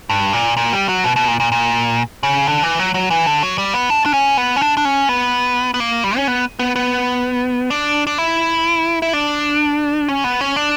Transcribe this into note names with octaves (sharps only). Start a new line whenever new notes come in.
G2
A#2
A#2
G3
F#3
B2
B2
A#2
A#2
A#2
C#3
D3
E3
F#3
F#3
E3
D3
F#3
G3
B3
D4
D4
C#4
B3
C#4
D4
D4
C#4
B3
B3
A#3
G3
C#4
B3
B3
B3
D4
D4
E4
E4
D4
C#4
B3
C#4
D4